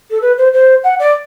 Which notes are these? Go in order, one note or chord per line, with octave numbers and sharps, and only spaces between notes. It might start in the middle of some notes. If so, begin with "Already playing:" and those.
A4
B4
C5
C5
F#5
D5